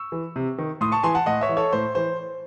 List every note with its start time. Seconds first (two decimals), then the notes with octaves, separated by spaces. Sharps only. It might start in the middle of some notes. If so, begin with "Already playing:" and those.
Already playing: C#6 E6
0.12 E3
0.36 C3
0.58 D#3
0.81 A2 C6 D#6
0.92 A5 C#6
1.03 E3 G#5 C6
1.15 F#5 A5
1.26 A2 D#5 F#5
1.41 C#5 E5
1.49 E3
1.57 A4 C#5
1.73 A2 C5
1.95 E3 C5